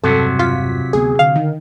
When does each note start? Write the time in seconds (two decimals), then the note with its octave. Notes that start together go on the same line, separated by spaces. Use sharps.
0.04 E1 G2 C3 F#3 A4
0.39 F4 B6
0.93 D2 G#3 B3 G#4
1.19 D3 F5
1.36 D#3